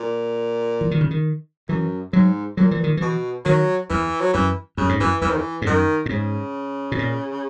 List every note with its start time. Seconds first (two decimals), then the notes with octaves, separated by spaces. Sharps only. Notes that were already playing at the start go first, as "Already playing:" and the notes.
Already playing: A#2
0.81 E3
0.91 D#3
1.01 C#3
1.11 D#3
1.69 F#2 E3
2.13 G#2 F#3
2.57 A#2 F#3
2.71 E3
2.84 D#3
2.97 B2 E3
3.45 D#3 F#3
3.90 E2 E3
4.21 F#3
4.33 F#2 E3
4.77 F#2 C#3
4.89 G#2
5.00 F#2 E3
5.22 E2 E3
5.30 D#3
5.38 E3
5.62 G#2
5.66 F#2 D#3
6.06 A#2
6.10 G#2 C#3
6.92 B2
6.98 A#2